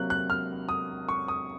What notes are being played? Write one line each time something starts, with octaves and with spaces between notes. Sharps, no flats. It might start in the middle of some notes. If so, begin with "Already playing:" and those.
Already playing: C3 F#3 A#3 F#6
F#6
F6
D#6
C#6
D#6